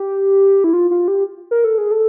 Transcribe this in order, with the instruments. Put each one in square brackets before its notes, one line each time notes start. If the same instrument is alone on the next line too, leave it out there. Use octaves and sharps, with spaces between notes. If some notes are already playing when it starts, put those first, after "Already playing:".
Already playing: [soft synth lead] G4
E4
F4
F4
G4
A#4
A4
G#4
A4